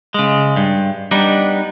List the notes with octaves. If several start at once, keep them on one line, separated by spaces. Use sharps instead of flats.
C#3 G#3
G2
G3 B3 D4 D#4